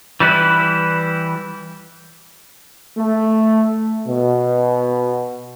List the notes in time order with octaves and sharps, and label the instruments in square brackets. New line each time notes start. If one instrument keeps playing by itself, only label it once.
[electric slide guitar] E3 G3 E4 B4
[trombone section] A3
B2